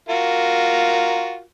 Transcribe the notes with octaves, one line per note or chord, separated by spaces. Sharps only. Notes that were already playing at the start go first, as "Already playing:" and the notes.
F4 F#4 A#4